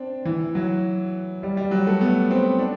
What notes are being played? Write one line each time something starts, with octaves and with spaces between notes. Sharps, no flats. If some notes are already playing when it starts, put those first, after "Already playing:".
Already playing: C4 D4
E3
F#3
G3
G3
F#3
A3
B3
C4
D4